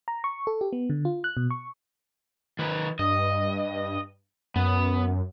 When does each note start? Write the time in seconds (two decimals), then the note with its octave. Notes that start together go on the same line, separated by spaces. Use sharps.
0.08 A#5
0.24 C#6
0.47 A4
0.61 G4
0.73 B3
0.90 D3
1.05 F4
1.24 F#6
1.37 B2
1.51 C#6
2.59 D#3 B4
2.99 G2 D#5
4.56 F#2 B3